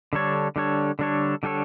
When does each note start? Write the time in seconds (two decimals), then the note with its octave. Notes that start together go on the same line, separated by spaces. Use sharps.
0.13 D3 G3 D4 A4 C#5
0.56 D3 G3 D4 A4 C#5
0.99 D3 G3 D4 A4 C#5
1.43 D3 G3 D4 A4 C#5